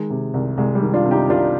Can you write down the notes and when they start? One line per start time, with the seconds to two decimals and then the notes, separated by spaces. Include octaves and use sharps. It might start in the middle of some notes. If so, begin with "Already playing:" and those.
Already playing: D#3 G#3
0.10 C3
0.34 C2
0.57 C2 G#3
0.75 G3
0.82 D#3
0.94 D4 F4
1.06 C3
1.11 D#4 G4
1.29 C2 D4 F4